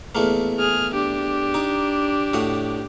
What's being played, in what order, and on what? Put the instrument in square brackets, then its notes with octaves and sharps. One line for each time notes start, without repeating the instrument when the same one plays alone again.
[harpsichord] E2 A3 A#3
[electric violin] G#4 F6
D4 G4
[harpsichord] D#4
A2 F#4 D#5